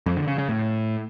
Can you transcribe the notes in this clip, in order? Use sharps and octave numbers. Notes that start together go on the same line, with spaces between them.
F2
D3
C#3
C#3
A2